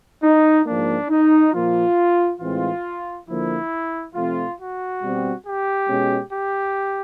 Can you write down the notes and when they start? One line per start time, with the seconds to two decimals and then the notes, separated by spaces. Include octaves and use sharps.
0.22 D#4
0.66 G#2 F3 A#3 D4
1.09 D#4
1.53 A#2 F3 A#3 F4
2.40 A2 E3 G#3 C4 F4
3.27 D3 F3 A#3 E4
4.14 C3 F3 A3 C4 F4
4.58 F#4
5.01 B2 G3 C4
5.45 G4
5.88 B2 G#3 C#4
6.31 G4